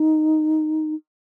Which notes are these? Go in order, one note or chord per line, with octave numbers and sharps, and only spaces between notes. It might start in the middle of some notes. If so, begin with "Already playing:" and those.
Already playing: D#4